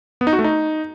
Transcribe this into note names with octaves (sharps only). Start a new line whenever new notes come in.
B3
D#4
F#4
A3
D#4